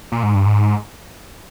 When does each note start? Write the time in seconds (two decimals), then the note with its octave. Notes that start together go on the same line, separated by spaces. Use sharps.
0.12 A#2
0.23 G#2
0.35 G2
0.46 G#2